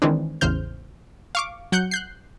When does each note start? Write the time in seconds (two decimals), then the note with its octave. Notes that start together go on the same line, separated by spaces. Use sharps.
0.02 D#3 E3 G#3 C4 D4
0.41 A1 E2 C#3 C5 F6 G6
1.35 F5 C#6 D6
1.72 F#3 F#5 F#6 G6 C#7
1.91 F#6 G6 C7